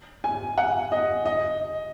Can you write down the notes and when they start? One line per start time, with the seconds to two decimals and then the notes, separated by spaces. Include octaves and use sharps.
0.24 G#5
0.58 F#5
0.92 D#5
1.25 D#5